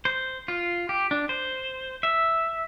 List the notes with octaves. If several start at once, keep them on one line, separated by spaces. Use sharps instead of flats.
C5
F4
G4
D4
C5
E5